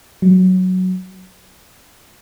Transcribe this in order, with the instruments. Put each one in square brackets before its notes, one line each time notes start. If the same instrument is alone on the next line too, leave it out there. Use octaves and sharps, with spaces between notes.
[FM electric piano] F#3